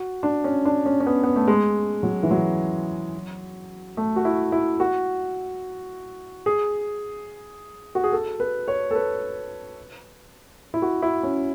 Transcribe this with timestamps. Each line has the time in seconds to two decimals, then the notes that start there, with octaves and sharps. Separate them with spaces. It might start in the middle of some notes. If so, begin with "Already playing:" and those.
Already playing: F#4
0.23 D4
0.44 C#4
0.65 D4
0.86 C#4
1.00 C#4
1.06 B3
1.24 B3
1.36 A3
1.48 G#3
2.03 F#3
2.23 E3
2.31 F#3
3.97 A3
4.16 F#4
4.25 E4
4.52 E4
4.80 F#4
6.46 G#4
7.95 F#4
8.04 G#4
8.12 A4
8.40 B4
8.68 C#5
8.91 A4
8.95 B4
10.74 E4
10.82 F#4
11.02 E4
11.23 C#4